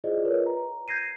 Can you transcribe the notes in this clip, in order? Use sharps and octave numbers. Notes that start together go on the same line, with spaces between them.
E4 F4 G#4 C5 D5 D#5
F4 A#4 B4 C#5
A#5
G6 G#6 A#6 C7 D#7